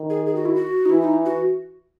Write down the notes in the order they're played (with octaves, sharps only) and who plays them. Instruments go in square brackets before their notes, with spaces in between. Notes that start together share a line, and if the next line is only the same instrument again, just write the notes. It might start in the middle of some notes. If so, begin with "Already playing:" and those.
Already playing: [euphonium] D#3
[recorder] G#4
G#4
F#4
E4
F#4
D#4
[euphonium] E3 [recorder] E4
[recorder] D#4
F#4